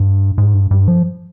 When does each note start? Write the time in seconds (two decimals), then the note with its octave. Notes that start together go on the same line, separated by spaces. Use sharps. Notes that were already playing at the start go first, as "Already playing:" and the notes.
Already playing: G2
0.38 G#2
0.54 G2
0.71 G2
0.88 F3